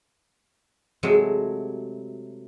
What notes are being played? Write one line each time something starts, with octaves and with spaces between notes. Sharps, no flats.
C3 F#3 G#3 A3